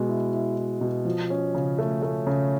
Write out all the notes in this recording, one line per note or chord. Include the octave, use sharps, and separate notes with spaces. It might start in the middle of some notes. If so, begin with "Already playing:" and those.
Already playing: B2 G#3
E4
E4
E4
B2
F3
C#4
C#3
A3
A3
C#3